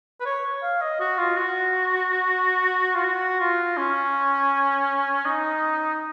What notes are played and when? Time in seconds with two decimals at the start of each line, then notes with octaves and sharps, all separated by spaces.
0.20 B4
0.26 C#5
0.63 F5
0.81 D#5
1.00 F#4
1.18 F4
1.37 F#4
2.95 F4
3.04 F#4
3.40 F4
3.77 C#4
5.25 D#4